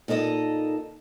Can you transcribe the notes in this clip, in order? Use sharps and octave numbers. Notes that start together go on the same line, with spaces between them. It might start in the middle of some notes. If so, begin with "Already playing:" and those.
A#2 D#4 A4 D5 D#5